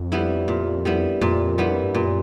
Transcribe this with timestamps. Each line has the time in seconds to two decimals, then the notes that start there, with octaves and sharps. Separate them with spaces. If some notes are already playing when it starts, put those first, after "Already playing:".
Already playing: F2
0.12 G3 B3 E4
0.48 A#2
0.85 G3 B3 E4
1.21 F2 A#2
1.58 G3 B3 E4
1.84 G2
1.95 F#2 A#2